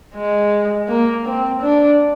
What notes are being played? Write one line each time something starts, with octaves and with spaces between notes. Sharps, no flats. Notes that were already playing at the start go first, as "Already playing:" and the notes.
G#3
A#3
C4
D4